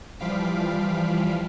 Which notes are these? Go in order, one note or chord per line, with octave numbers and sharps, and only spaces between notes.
E3 F3 G3 F5 B6 D7